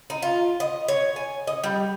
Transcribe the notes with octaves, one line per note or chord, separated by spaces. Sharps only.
D#4
F4
D#5
C#5
G#5
D#5
G3